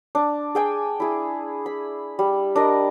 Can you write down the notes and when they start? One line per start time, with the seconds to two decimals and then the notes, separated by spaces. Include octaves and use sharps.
0.15 D4
0.55 G#4 G5 G#5
1.00 E4 G#4
1.66 B5
2.19 G3
2.56 D4 A#4 D#5